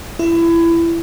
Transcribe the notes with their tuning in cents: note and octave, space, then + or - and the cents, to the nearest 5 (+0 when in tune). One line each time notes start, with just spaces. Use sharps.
E4 +25